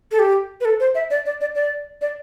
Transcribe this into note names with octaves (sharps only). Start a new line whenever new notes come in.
A4
G4
B4
A4
C5
E5
D5
D5
D5
D5
D5